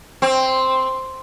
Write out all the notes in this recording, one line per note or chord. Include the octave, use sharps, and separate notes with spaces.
C4